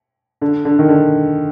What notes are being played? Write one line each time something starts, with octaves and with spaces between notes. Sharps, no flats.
D3
D3
D#3
D3